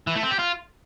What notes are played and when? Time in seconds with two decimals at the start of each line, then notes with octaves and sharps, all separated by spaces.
0.07 E3
0.15 A3
0.23 C4
0.31 G4
0.39 F4